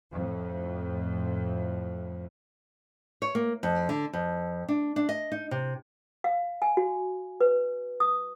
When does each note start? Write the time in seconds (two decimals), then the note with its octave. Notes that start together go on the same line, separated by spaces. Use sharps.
0.12 F2 A2
3.22 C#5
3.35 A#3
3.63 F2
3.89 D3
4.13 F2
4.68 D4
4.96 D4
5.09 D#5
5.32 D#4
5.51 C3
6.24 F5
6.62 G#5
6.77 F#4
7.41 B4
8.00 D#6